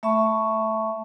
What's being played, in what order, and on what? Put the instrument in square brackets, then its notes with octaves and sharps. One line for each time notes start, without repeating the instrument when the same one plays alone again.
[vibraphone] A3 E5 A5 B5 C#6